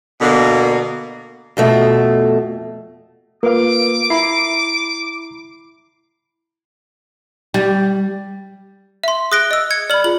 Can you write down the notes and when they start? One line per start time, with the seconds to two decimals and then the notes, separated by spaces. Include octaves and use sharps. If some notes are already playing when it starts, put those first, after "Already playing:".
0.21 B2 D3 A#3
1.57 F2 B2 A3
3.43 A#3 F4 A#4 B4 F5 D6
4.10 E4 A#5 B5 C7
7.54 G3
9.04 E5 C6
9.32 G#4 D#6 F#6 A#6 D7 G7
9.51 D#5 E6
9.71 G#6 C#7
9.90 D5 B5 F6 F#7
10.04 F4 G#4 F#7